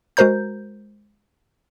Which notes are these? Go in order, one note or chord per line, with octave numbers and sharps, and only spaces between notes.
G#3 F#4 A#4 C5 A#5 G6